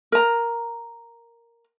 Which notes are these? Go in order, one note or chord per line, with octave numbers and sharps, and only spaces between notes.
A#4 A#5